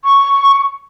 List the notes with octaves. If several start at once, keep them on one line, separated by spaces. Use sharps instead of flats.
C#6